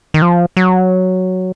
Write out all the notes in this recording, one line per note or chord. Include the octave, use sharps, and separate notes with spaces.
D#3
F3
F#3